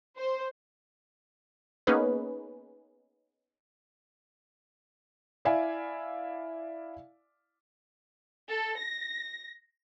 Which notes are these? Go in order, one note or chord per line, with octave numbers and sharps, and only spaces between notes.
C5
A#3 B3 C#4 D#4 G#4 B4
E4 D5 E5 F5 G#5
A4
A#6